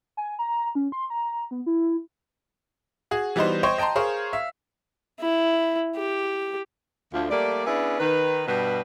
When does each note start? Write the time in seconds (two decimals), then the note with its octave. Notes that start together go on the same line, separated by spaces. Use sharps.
0.17 G#5
0.39 A#5
0.75 C#4
0.92 C6
1.10 A#5
1.51 B3
1.66 E4
3.11 F#4 G#4
3.36 E3 G3 B3 D#4 F#4 C5
3.63 C5 C#5 D#5 G5 C6 C#6
3.78 D#5 G5 A5 A#5 C6
3.96 G#4 A#4 C5 C#5 F5
4.33 E5 F5
5.20 E4
5.96 G4
7.13 D2 F3
7.30 G3 A3 A#3 D5
7.66 B3 C#4 D4 E4 G#4 B4
7.99 D#3 B4
8.48 G2 B2 G3 B4